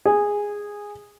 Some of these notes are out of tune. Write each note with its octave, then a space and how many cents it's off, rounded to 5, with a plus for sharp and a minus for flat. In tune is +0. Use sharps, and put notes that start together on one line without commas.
G#4 -10